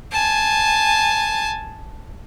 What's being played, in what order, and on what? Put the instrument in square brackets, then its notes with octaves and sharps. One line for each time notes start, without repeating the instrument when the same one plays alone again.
[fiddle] G#5 A5